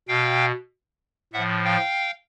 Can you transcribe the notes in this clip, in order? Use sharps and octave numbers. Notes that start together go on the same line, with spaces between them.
B2 F5 G5
A2 F3 E5 F#5
F5 G5